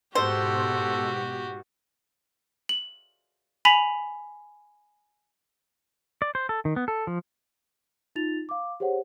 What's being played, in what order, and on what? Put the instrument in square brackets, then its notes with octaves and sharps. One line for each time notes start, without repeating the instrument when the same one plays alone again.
[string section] G#2 B2 [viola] F#4 G4 [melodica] A4 [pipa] C5
[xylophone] F#7
G#5 B5 B6 F7
[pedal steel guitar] D5
C5
A4
D#3
B3
A4
F3
[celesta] D#4 F4 A6 F7
F5 D6
G4 G#4 C5 C#5 F#5